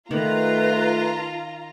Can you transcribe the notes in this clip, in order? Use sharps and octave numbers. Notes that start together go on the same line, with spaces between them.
D#3 A3 F4 B4 A#5